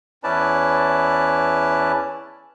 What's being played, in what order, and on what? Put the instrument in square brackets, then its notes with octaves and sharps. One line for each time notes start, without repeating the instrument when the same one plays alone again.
[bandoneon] E2 C#4 E4 B4 D5 A5